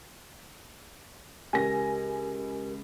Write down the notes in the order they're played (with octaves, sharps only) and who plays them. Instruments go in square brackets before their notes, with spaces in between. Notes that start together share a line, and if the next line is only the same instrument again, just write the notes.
[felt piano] C#2 [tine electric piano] G4 A#4 [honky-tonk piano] G#5 A#6